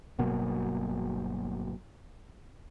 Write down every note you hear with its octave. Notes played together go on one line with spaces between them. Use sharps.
G1 B2 F#3 A#3